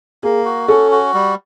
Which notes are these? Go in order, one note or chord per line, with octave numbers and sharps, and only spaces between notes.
A#3 G#4
F#4
C#4 A4
F#4
G3